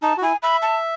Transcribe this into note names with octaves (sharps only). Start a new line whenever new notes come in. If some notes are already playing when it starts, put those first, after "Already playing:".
D#4 A5
F#4
E4 G#5
E5 B5
A5